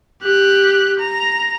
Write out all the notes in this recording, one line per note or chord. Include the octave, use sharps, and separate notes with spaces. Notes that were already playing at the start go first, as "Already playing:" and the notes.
G4 F#6
A#5